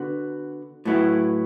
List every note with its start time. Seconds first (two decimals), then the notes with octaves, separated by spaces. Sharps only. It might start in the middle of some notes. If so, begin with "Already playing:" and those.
Already playing: D3 B3 F#4
0.85 A2 F#3 B3 E4